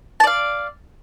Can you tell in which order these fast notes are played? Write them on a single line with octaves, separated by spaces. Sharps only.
A5 D5 F5